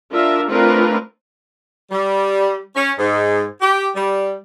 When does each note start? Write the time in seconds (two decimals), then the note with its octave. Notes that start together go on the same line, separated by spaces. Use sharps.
0.11 D4 F4 A#4 E5
0.50 A3 C4 D4 F4 A#4 B4
1.90 G3
2.75 C#4
2.98 G#2
3.61 G4
3.94 G3